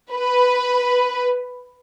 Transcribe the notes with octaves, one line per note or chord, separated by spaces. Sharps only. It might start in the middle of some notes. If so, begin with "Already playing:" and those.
B4